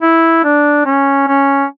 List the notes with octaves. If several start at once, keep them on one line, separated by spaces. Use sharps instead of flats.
E4
D4
C#4
C#4